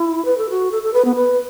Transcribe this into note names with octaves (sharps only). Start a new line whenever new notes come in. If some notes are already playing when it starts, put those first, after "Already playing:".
Already playing: E4
B4
A4
F#4
A4
A4
B4
B3
B4